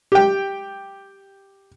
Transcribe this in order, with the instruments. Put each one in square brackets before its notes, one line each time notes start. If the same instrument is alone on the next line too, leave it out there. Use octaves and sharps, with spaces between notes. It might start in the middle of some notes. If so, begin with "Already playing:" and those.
[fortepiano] G4 G5